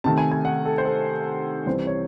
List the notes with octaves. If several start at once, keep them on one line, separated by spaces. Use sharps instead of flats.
C3 D#3 A3 A5
G#5
G#5
F#5
A4
C5
A4
C2 C3 E3 C5
C#5